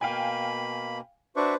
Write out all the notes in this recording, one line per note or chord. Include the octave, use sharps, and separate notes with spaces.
B2 A#3 F5 G5 G#5 B5
D4 F#4 B4 C5 E5 C#6